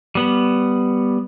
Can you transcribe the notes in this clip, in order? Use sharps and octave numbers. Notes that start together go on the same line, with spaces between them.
G3 B3